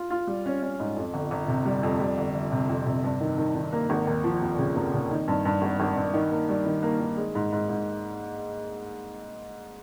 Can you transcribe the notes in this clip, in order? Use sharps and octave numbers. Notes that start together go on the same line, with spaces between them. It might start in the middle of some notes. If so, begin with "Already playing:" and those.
Already playing: F4
F4
G3
C#4
C#4
G#2
F2
G1
G1
C3
G3
F2
G3
G1
G1
C3
F2
C3
G2
D#3
D#3
D#3
A#3
G#1
D#2
F3
F1
C#3
F1
C#3
D#3
G2
G2
G#1
G#1
G2
D#3
A#3
G3
D#3
A#3
D#3
G#3
G#2
G#2
G#2